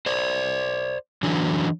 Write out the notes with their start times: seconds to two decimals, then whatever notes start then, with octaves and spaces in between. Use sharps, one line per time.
0.06 C5 D5
1.23 D3 E3 F#3 D4